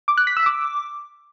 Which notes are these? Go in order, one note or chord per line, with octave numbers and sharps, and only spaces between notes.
D6
F#6
B6
E6
D6